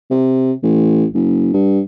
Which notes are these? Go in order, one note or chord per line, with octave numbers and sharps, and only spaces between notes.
C3
A1
F#1
G2